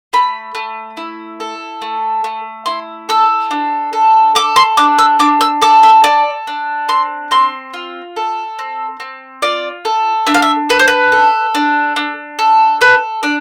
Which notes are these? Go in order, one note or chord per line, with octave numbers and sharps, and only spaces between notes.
A3 B5
A3
E4
A4
A3
A3
E4 C6
A4 E6
D4
A4
A4 D6
C6
D4 D6
E6
D4 D6
E6
A4 D6
E5
A4 D5
D4
C4 C6
C4 C6
F4
A4
C4
C4
F4 D5
A4
D4 E5
F5
E5
A4 B4
C5
B4
A4
D4
D4
A4
A4 B4
D4 D5